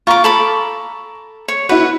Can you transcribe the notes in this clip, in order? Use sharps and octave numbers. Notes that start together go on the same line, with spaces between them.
F4 A#5 C#6 D6
A4 B5 D6
C#5
E4 F#4 B4 B5